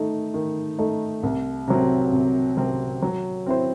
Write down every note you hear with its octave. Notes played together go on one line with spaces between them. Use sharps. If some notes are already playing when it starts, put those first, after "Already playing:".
Already playing: D#3 A3 D#4
D#3
A3 D#4
C2
C3 F#3 C4
C2
C3 F#3 C4
F#3
C4 E4 C5